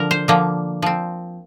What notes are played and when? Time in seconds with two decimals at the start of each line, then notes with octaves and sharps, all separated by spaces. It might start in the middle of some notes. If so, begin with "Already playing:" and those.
Already playing: D3 F3 A#4
0.11 C5
0.28 D3 F3 A#3
0.82 F3 C4